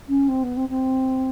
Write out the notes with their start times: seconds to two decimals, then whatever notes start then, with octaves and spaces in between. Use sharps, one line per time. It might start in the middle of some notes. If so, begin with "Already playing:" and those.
0.08 C#4
0.28 C4
0.43 B3
0.56 C4
0.69 C4